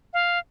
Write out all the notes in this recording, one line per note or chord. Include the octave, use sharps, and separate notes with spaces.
F5